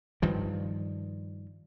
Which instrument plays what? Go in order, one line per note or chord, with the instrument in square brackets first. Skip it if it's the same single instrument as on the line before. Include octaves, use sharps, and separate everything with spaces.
[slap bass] G2 D#3 F3